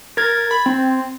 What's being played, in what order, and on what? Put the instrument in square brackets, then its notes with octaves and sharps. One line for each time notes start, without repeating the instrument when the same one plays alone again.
[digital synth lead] A#4 [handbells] G#6 A6
[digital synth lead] B5
C4